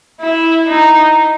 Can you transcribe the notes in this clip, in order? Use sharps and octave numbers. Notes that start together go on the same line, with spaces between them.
E4
D#4